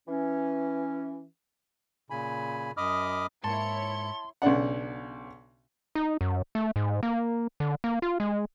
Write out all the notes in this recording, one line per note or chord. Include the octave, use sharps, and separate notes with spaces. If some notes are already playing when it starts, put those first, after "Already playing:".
E3 C#4
A#2 C#3 G#5 B5
F#2 D#5 B5 D6 D#6 F6
G#2 A#3 E4 C#5 A5 C6 C#7
B1 C#3 D4 F#5
D#4
F#2
A3
G#2
A#3
D3
A#3
F4
G#3